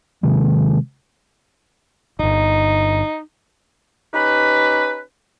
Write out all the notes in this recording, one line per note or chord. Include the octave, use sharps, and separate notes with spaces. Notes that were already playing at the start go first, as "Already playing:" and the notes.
C3 D#3 G#3
D1 G1 D#4
C#4 D#4 G4 B4